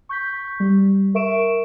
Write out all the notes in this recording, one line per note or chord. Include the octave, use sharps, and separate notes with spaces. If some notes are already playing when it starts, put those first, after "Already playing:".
C#6 G6 B6
G3
A#4 E5 C#6 D7 E7